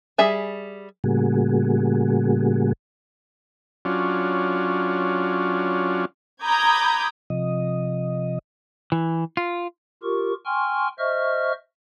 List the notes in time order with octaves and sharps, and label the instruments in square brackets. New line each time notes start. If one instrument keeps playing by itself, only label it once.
[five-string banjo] G3 G#4 E5 G#5
[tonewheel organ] A2 C#3 G3 A#3 F#4 G#4
[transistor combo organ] F#3 C#4 D4 F4
[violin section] A#5 B5 D6 D#6 G6 G#6
[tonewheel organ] C3 F3 D#5
[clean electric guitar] E3
F4
[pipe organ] F4 G4 A#4 C#6
G5 G#5 C6 C#6 F6
C5 D#5 E5 C#6 F6